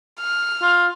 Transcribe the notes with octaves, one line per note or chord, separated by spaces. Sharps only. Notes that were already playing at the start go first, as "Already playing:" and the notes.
F6
F4